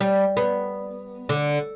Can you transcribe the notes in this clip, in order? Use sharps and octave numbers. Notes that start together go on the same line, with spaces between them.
G3
B3
D3